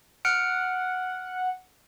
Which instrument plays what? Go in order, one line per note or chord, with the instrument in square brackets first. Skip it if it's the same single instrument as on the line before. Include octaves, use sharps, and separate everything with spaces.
[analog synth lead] F#5 [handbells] F6 C#7 D7